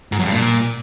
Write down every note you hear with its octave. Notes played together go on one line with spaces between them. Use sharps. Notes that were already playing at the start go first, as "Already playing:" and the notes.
G#2
F#2
G2
A#2